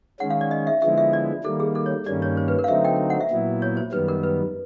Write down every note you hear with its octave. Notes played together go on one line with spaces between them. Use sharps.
D#3 G#3 C#4 F#5
F5
D5
D#5
E5
D3 F3 G#3 B3 E4 E5
E5
D5
D#3 G3 A#3 A4
G#4
A4
C#5
G2 D#3 G3 A#3 C#4 D5
C#5
C5
B4
A#4
F5
D3 F#3 A3 C4 D#4 E5
G5
F#5
E5
A#2 F#3 B3 E4
C#5
C5
F#2 D#3 G3 B3 B4
A#4
B4